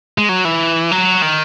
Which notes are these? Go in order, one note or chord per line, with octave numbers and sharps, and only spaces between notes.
G#3
F#3
E3
F#3
D#3